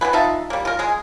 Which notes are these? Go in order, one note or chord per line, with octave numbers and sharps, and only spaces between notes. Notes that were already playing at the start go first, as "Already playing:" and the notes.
E3 B3 G#4 B4
D#4 F4 E5 A5
G3 A#3
F4 A#4
G#3 G#4